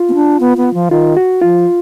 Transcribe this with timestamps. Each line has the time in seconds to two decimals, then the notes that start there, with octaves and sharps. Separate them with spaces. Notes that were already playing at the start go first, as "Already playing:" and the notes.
Already playing: F4
0.09 B3
0.14 D4
0.40 B3
0.57 B3
0.74 F3
0.91 D#3 F4
1.17 F#4
1.42 F3 F4